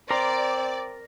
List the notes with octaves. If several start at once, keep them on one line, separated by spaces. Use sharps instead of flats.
C4 A#4 D5 A#5 C6